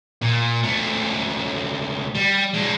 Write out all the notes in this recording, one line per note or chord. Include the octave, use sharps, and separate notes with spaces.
A#2
C#2 A3
G3
G#3 D4